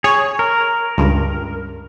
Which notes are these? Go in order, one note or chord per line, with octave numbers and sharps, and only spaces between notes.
G#4 C#5
A#4
C#2 G2